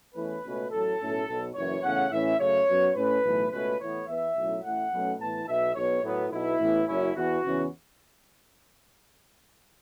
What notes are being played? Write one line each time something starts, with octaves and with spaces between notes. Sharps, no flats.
E2 E3 A3 C#4 B4
C#2 B2 A3 C#4
A1 A2 F#3 A4
B1 A2 A3 C#4
B1 B2 F#3
F#1 F#2 E3 C#5
E2 C#3 A3 C#4 F#5
A2 E3 C#4 E5
F#2 C#3 A3 C#5
F#2 F#3 B3
A2 A3 C#4 B4
B1 A2 E3 A3
C#2 B2 A3 C#4 B4
A2 E3 B3 C#5
E2 E3 B3 E5
B1 A2 F#3 C#4
A1 A2 A3 F#5
B1 B2 F#3 A3 C#4
A2 E3 B3 A5
B1 B2 B3 E5
B1 B2 B3 C#5
A2 F#3 B3
B1 B2 B3 E4
A1 A2 E3 B3
F#1 F#2 F#3 C#4 E4
E2 E3 B3 F#4
E2 C#3 E3 C#4